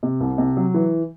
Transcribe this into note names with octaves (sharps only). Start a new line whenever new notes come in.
C3
C2
C3
F#3
E3